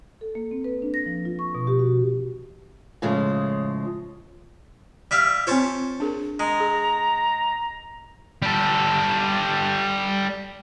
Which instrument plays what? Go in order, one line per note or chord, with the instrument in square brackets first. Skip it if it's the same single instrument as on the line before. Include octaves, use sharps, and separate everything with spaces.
[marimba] A4
A#3
C4
B4
D4
A#6
F3
F4
C#6
B2
G4
F#4
[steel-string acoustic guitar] A2 C#3 F3 G#3
[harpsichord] G3 E5 F5
[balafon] C4 F4 [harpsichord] C5 C#5 A5
[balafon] D4 G#4 A#4
[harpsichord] G#3 [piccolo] A#5
[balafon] G#4
[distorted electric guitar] G3 A4